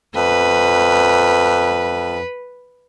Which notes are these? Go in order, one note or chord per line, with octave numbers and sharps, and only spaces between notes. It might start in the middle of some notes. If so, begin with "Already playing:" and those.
F2 B4